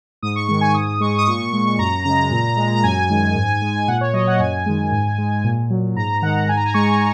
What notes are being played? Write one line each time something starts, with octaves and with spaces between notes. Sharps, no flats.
G#2 D#6
C#6
D#3 G#3 C#6
G#5
G#2 D#6
G#3 C#6
D#6
A#2 C#6
G#3
F#2 A#5
C#3 G#3 A#5
A#2
G#3
A#5
F#2 G#5
D#3 G#3
G#2
G#3
A#2 F#5
C#5
F#3 D#5
F#5
F#2 G#5
D#3 G#3
G#2
G#3
A#2
F#3
G#2 A#5
D#3 G#3 F#5
G#2 G#5
A#5
G#5
G#3 C#6